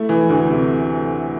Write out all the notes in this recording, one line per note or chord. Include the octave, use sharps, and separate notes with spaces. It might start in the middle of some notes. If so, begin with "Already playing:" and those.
Already playing: A3 E4
E3
D2
C3